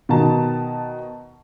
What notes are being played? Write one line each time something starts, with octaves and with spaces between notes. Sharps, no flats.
B2 D#3 A5